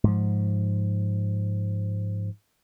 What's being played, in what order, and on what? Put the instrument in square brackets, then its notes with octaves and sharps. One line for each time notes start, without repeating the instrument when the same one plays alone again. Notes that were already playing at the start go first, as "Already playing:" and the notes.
[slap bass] G#2 F3